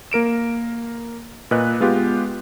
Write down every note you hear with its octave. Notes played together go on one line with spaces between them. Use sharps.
A#3 A#4 D7 E7
A#2 B4 D#5 F#6
G#3 B3 F4 G4